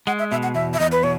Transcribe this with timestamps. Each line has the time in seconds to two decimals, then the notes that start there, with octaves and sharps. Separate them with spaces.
0.07 G#3 F#5
0.19 E5
0.31 B2 E5
0.43 F#5
0.55 E2 E5
0.74 E5
0.80 E2 D#5
0.92 B4
1.03 B2 C#5